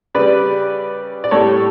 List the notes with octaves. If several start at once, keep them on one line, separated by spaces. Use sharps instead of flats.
C#3 G3 B4 D5
D5
A2 G3 A4 C#5